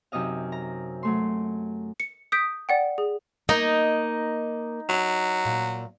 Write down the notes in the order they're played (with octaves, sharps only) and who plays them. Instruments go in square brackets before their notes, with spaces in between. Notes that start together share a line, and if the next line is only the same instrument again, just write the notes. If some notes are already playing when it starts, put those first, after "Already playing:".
[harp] F#2 C3 D#4 D#5 F5
A#5
F#3 A3 C6
[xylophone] C#7
D#6 G6 B6 D7
D5 F#5 G5
G#4
[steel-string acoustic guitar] A#3 D#5 [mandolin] D#4
[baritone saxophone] F#3
[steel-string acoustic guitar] A#2